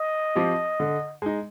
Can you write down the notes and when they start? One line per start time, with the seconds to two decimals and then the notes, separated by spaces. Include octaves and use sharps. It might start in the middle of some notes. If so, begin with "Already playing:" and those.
Already playing: D#5
0.36 F3 C4 G4
0.80 D3
1.22 G#3 D#4